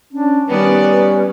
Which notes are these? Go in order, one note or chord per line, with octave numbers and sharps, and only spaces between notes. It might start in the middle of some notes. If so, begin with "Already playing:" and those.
C#4 D4
D#3 G3 B3 C#4 B4 D5